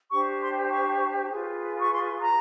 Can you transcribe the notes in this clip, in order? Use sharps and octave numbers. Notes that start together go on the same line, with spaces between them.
D4 G4 C5 C#6
C6
C#6
F4 G#4 B4
C#6
C6
A#5